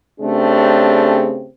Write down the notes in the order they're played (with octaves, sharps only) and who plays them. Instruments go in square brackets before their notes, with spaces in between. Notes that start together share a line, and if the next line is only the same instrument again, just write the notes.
[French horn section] C#3 A3 C4 D4 G4 G#4